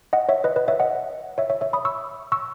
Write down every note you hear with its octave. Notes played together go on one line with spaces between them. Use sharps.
D#5 F#5
C#5 E5
B4 D#5
B4 D#5
C#5 E5
D#5 F#5
C#5 E5
C#5 E5
C#5 E5
B5 D#6
C#6 E6
C#6 E6